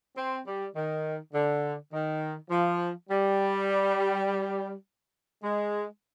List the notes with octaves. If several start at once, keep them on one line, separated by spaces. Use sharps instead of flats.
C4
G3
D#3
D3
D#3
F3
G3
G#3